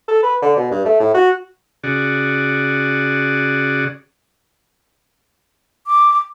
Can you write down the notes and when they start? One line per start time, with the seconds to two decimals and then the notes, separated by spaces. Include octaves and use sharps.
0.08 A4
0.23 B4
0.42 D3
0.57 B2
0.71 G2
0.86 A3
1.00 A2
1.15 F#4
1.84 C#3 F#4 G#4 D5
5.87 D6